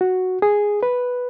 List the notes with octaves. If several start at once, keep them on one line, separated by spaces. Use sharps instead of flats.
F#4
G#4
B4